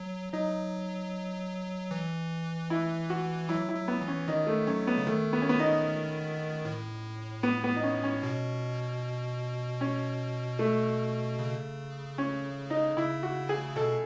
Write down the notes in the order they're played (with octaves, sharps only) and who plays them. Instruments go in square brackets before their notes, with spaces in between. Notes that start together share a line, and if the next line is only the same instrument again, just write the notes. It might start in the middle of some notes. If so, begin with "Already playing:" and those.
Already playing: [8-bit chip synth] F#3
[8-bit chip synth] F#3 [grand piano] D#4
[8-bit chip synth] E3
[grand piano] E4
F#4
[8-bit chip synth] F#3 [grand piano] E4
[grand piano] E4
[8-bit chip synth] F#3
[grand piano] B3
[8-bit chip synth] E3
[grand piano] C#4
[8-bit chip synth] D#3 [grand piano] D#4
[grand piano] A3
[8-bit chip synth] F#3 [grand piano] C#4
[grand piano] B3
[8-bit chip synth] C#3
[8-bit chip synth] D#3 [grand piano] A3
[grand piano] B3
C#4
B3
D#4
[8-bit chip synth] A2
[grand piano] B3
B3
D#4
C#4
C#4
[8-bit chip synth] B2
[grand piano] C#4
A3
[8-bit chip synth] C#3
[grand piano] C#4
D#4
[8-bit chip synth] C#3 [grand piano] E4
[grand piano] F#4
G#4
[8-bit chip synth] B2 [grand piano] A4